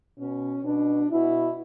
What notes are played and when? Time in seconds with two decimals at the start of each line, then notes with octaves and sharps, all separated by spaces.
0.18 B2 C#4
0.64 B2 D4
1.10 B2 E4